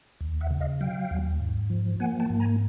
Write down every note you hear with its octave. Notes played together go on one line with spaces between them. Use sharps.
D#2
E5 F#5
C#3
D#5 F5
F#3 F5 G5
D#2
G#2
F3
A#3 F#5 G#5
G5 A5
G#2
G#5 A#5